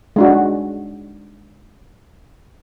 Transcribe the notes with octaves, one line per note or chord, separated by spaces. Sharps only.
G#3 D4 F#4